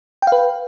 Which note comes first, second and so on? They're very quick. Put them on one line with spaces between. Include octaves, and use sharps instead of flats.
G5 F5 B4